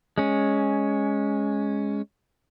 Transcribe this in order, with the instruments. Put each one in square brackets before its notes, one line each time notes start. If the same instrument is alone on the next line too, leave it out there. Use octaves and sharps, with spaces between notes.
[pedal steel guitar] G#3 C#4